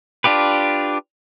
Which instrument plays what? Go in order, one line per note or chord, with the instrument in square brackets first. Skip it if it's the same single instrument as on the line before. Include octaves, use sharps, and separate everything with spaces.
[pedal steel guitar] D4 F4 G4 B4